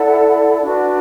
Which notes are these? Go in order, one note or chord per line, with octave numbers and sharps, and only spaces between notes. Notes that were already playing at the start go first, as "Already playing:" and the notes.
Already playing: E4 A4 D5 F#5
D4 F#4 B4